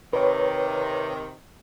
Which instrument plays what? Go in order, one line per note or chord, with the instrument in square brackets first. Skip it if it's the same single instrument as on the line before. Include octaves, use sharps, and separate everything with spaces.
[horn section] C3 D#3 [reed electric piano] B4 C#5